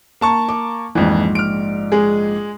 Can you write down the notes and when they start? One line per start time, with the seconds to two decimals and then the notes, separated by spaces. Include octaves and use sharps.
0.21 A#3 A5 C#6
0.49 D6
0.95 A#1 F2 G#2 E3
1.35 F6 D7
1.92 G#3 G#4